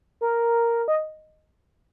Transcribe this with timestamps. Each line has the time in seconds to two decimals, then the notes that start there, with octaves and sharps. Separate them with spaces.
0.21 A#4
0.88 D#5